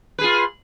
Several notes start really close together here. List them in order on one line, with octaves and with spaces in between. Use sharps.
B4 G#4 F4